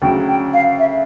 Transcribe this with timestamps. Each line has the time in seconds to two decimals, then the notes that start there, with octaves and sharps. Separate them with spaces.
0.02 D2 C#3 F#3 G5
0.28 G5
0.54 F5
0.79 E5